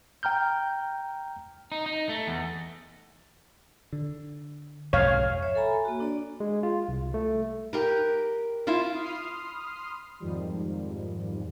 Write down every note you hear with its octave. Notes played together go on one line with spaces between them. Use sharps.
G5 A#5 F6 G6
D#4
D#4
A3
E2
D3
B1 F2 G#2 C#5 F5
C#5 E5
A4 G#5 A#5 B5
A#3 F#4
D4 D5
G#3
F4
C2
A3
G4 A#4 B4
E4 F4 E5 F5
B5 C6 D#6 F6 C7
F2 G#2 D#3 F3 G3